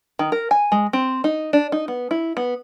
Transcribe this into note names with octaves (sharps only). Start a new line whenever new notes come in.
D#3
A#4
G#5
G#3
C4
D#4
D4
D#4
B3
E4
B3